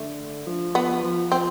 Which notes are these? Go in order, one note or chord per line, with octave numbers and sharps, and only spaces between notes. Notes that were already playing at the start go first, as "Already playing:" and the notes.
Already playing: D3 A3
F3
B3
F3
C4